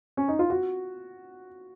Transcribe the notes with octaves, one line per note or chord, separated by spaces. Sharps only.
C#4
D#4
F4
F#4